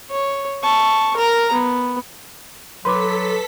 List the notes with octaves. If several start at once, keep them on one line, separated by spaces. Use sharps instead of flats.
C#5
A5 C#6
A#4 A#5
B3
F#3 A4 B4 C6 D6 B6